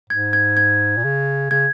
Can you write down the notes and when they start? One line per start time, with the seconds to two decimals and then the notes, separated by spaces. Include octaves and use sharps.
0.10 G#2 G#6
0.33 G#6
0.57 G#6
0.97 A#2
1.04 C#3
1.51 C#3 G#6